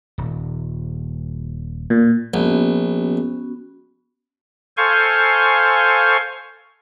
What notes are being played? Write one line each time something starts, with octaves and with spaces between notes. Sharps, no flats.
D#1
A#2
A#1 B3 C#4 F#4
A4 C5 F5 G#5 C6 C#6